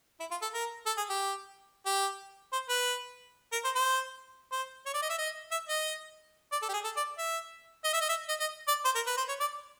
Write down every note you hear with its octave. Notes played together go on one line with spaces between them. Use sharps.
E4
F4
A4
A#4
A4
G#4
G4
G4
C5
B4
A#4
C5
C5
C5
C#5
D5
D#5
E5
D#5
E5
D#5
D5
A4
G4
G#4
A4
D5
E5
D#5
E5
D#5
E5
D#5
D#5
D5
C5
A#4
B4
C5
C#5
D5